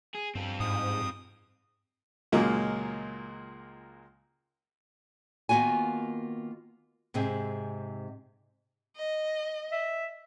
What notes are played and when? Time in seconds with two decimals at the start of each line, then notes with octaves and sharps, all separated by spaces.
0.14 G#4
0.35 G2 C4 A4
0.60 G#2 D#6
2.32 C#2 A#2 F#3 G#3 A#3
5.49 D#3 A#3 B3 F4 F#4 G#5
7.14 G#2 C3 C4 G#4
8.96 D#5
9.72 E5